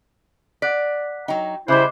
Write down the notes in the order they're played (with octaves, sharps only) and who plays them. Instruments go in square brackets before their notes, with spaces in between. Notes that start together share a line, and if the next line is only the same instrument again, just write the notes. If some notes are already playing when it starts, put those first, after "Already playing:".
[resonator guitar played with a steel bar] D5 [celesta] F#5 F#6 B6
[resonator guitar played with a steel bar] F#3 D#4 [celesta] G5
[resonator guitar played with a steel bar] C#3 G3 [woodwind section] E4 C5 [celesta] D#5 D6 F#6